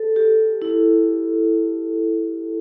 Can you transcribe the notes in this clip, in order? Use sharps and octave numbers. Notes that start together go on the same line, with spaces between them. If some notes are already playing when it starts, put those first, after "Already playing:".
Already playing: A4
G4
E4